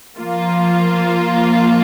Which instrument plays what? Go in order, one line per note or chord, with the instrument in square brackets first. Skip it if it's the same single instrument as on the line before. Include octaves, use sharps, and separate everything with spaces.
[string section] F3 A#3 F4